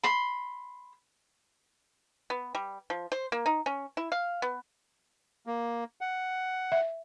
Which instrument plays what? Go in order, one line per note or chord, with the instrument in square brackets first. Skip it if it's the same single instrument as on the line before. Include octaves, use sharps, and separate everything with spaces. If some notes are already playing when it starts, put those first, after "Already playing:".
[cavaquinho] B5 C6
[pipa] B3
G3
F3
C5
A#3
D#4
C#4
E4
F5
B3
[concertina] A#3
F#5
[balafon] E5